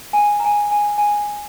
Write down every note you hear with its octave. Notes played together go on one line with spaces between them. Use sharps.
G#5
G5
A#5
G#5
G#5
G#5